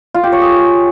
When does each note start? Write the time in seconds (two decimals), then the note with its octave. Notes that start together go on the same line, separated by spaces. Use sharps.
0.14 F4
0.23 G4
0.32 C#5
0.41 G#4